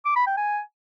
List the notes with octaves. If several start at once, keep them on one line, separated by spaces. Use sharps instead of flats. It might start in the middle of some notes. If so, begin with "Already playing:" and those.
D6
B5
G5
G#5